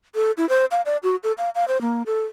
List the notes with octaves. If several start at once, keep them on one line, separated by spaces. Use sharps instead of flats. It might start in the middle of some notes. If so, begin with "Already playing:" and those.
A4
E4
C5
F5
D5
F#4
A4
F5
F5
C5
A#3
A4